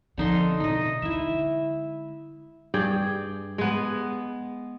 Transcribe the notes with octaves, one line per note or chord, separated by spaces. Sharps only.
D3 F3 C4 D#4 C6
B2 D#4 D#5
D3 G#3 E4 E5
G2 G#4 D5 G5
G#3 B3